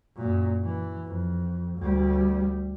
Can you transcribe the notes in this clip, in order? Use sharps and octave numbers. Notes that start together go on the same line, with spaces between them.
F#2 A#2
E3
F2
D2 G3